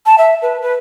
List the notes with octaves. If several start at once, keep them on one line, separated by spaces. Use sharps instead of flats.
A5
E5
B4
B4